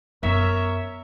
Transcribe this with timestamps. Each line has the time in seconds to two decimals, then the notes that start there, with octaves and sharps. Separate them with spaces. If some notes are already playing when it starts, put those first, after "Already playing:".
0.23 F#2 B3 A#4 C#5 E5